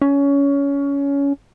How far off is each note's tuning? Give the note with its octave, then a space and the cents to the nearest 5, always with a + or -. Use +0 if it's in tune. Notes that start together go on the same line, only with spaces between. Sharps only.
C#4 +20